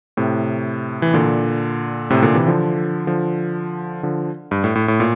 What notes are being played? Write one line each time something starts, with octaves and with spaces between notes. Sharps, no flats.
A2 C3
E3
A#2 D3
A2 C3
A#2 D3
C3 E3
D3 F3
D3 F3
D3 F3
G2
A2
A2
A2
A#2